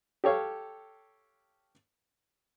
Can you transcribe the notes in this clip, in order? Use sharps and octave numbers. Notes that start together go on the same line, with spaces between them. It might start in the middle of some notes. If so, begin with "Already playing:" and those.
G4 A4 C#5 F5